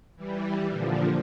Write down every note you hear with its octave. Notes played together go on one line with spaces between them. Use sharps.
E3 G3
A#2 D3 F3